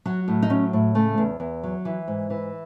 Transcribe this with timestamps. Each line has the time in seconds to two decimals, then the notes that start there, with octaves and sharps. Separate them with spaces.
0.05 F#3 F#4
0.28 A2
0.43 D#4
0.50 F#3 C#4
0.73 A2
0.95 C#3 A3
1.18 E2
1.40 E2
1.63 F#3
1.85 E3
2.08 G#2
2.30 E3